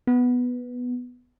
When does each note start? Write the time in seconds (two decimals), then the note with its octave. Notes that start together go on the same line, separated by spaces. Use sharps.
0.07 B3